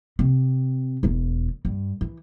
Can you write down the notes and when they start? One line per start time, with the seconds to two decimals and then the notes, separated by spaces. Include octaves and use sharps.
0.19 C3
1.03 E1 E2
1.65 G2
2.01 E3